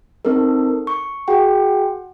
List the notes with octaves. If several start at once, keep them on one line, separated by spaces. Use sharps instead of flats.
C4 D#4 A4 A#4
C#6
F#4 G#4 F#5 G5